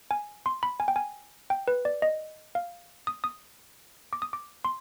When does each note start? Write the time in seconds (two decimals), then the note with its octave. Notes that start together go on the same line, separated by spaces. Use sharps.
0.11 G#5
0.46 C6
0.63 B5
0.80 G#5
0.88 G5
0.96 G#5
1.50 G5
1.68 B4
1.85 D5
2.02 D#5
2.55 F5
3.07 D#6
3.24 D#6
4.13 D6
4.22 D#6
4.33 D6
4.65 C6